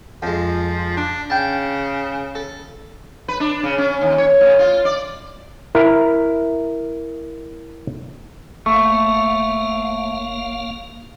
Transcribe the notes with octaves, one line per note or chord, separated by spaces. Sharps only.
F2 F3 G#3
D4
C#3 G5 A5
A4
B4
D4
C#3
C#4
D#2
C#5
A2
F4
D5
E4 A#4
F#1 A3 A#3 F5 C#6